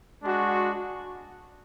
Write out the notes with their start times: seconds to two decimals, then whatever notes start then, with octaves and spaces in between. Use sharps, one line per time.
0.23 G#3 D4 F#4